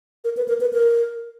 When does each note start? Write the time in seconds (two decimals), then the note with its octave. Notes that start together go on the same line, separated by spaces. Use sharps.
0.24 A#4
0.37 B4
0.48 A#4
0.61 B4
0.73 A#4